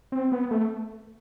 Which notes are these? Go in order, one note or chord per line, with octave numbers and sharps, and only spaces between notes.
C4
B3
A3